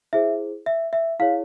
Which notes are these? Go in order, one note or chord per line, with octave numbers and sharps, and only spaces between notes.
E4 G#4 C5 E5
E5
E5
E4 G#4 C#5 F5